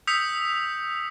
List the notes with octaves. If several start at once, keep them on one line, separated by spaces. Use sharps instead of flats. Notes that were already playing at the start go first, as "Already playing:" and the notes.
D#6 E6 G6 B6 C#7 F7